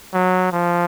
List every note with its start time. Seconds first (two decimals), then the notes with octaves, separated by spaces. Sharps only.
0.14 F#3
0.52 F3